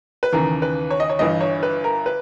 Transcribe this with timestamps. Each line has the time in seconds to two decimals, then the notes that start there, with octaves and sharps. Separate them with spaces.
0.23 B4
0.33 D#2 C#3 E3 A#4
0.62 B4
0.91 C#5
1.00 D#5
1.09 C#5
1.19 G1 G2 E3 D#5
1.41 C#5
1.63 B4
1.84 A#4
2.06 B4